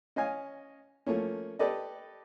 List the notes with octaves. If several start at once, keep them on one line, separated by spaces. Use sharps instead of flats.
C#4 D#5 F5 G#5
F3 A3 A#3 C#4
G4 A4 B4 D5 D#5